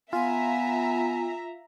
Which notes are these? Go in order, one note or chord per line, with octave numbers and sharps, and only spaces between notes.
B3 F4 E5 G#5 A#5